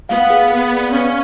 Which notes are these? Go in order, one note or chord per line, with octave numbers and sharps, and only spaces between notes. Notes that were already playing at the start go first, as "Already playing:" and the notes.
B3 F5
G#4
G#4
D5
C#4 F5